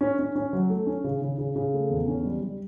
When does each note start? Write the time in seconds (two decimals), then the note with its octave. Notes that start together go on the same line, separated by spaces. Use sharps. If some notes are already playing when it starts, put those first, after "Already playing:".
0.01 C#4
0.19 C#4
0.35 C#4
0.53 F#3
0.70 A3
0.87 C#4
1.04 C#3
1.22 C#3
1.38 C#3
1.56 C#3
1.74 A3
1.90 E2
2.08 C#4
2.25 G3
2.42 G3